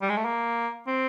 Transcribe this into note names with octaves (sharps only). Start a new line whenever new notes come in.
G3
G#3
A3
A#3
C4